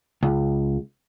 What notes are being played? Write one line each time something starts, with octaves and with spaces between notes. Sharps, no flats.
C#2